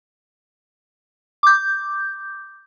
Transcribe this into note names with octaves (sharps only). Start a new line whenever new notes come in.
D6 G6